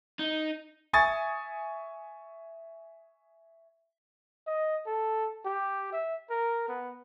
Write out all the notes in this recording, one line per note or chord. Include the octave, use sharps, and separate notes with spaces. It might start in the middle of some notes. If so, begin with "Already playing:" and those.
D#4
E5 G#5 C#6 D#6 G#6 A6
D#5
A4
G4
E5
A#4
B3